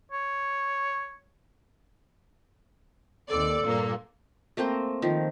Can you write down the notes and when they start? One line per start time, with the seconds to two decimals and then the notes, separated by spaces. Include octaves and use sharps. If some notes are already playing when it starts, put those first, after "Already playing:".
0.11 C#5
3.29 D#2 C4 A4 D5
3.63 G2 A#2 A#3
4.57 A3 A#3 C4 C5
5.02 D#3 F3